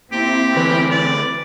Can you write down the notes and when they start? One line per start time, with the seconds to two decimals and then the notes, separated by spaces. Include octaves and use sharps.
0.12 A#3 C4 E4 G4
0.55 D2 E3 B4
0.91 D5